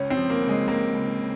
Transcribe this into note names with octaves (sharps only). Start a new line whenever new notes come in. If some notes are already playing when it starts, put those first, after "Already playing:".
Already playing: C#2 C#4
C4
F3
A#3
C#2
G#3
C#2 A#3
C#2
C#3